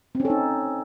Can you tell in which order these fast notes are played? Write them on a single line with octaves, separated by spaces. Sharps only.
C4 C#4 A4 D#4